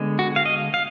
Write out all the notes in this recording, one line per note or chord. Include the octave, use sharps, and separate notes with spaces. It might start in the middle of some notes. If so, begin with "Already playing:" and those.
Already playing: D3 G#3 B3
F#4
F5
D#5
F5